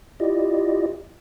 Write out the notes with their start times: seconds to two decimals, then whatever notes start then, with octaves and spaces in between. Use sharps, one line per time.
0.20 E4 F4 G4 D5 D#5